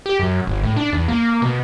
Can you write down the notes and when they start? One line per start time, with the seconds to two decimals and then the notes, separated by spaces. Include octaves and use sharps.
0.06 G4
0.20 F#2
0.47 G1
0.63 A2
0.76 D4
0.93 E2
1.08 A#3
1.42 B2